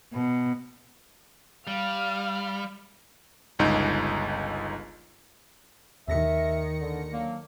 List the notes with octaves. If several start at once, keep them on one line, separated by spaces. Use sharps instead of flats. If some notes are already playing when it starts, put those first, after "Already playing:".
B2
G3 F5
G1 C#2 D#4
D#2 D#3 E5 A#6 C#7
D3
D3 F#3 A#3